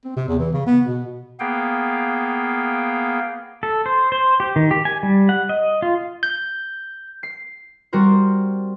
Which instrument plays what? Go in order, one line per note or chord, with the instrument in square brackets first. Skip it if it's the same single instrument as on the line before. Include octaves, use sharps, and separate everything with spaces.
[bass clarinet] C4
C3
E2
E3
C#3
B3
B2
[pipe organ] A#3 B3 G#4 F5 G5
[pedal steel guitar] A4
C5
C5
G4
D#3
G4
G#5
G3
F#5
D#5
F4
[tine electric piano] G6
[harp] C7
G3 C4 F#4 A#4 C5